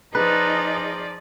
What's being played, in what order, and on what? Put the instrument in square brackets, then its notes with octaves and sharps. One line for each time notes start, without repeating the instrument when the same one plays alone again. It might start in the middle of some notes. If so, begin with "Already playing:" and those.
[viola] F3 D5 [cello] D#4 [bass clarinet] G#4 [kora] B4